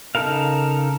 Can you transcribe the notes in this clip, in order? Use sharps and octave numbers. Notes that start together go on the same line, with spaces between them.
C#3 D#4 A4 A#4 F5